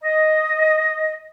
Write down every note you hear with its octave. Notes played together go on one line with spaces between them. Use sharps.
D#5